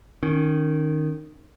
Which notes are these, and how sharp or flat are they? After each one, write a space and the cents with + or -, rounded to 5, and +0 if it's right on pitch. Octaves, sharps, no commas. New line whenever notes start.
D#3 -10 C#4 +0